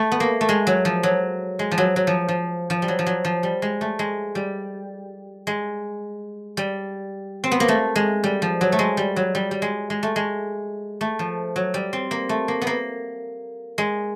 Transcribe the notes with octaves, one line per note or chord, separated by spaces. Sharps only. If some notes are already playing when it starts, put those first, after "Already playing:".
Already playing: A3
B3
A#3
A3
G#3
F#3
F3
F#3
G#3
F3
F#3
F#3
F3
F3
F3
G3
F#3
F3
F#3
F3
G3
G#3
A3
G#3
G3
G#3
G3
C4
B3
A#3
A3
G#3
G3
F3
F#3
A3
G#3
G3
F#3
G3
G3
G#3
G#3
A3
G#3
A3
F3
F#3
G3
C4
A#3
A3
A#3
B3
A#3
G#3